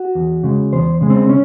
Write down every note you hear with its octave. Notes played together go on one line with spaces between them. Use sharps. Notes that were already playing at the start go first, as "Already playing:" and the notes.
Already playing: F#4
E2
C#3 G#3
E2 C5
C#3 G#3
C4
C#4